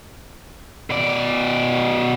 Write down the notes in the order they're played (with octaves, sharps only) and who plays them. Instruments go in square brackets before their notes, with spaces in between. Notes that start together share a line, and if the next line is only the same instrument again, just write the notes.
[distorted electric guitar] B2 D5